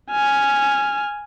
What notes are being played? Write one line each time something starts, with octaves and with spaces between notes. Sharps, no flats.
G#5 F6